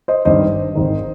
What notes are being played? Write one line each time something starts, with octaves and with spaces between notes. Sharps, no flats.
C5 D#5
G#1 G2 D#3 C5 D#5
G#1 G#2 D#3